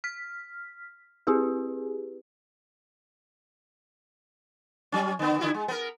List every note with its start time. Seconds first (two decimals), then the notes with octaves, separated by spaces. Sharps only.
0.04 F6 B6
1.27 C4 E4 G4 G#4 B4
4.92 F#3 C#4
5.19 D3 B3
5.39 D3 E4 F#4
5.54 G#3
5.68 B3 A#4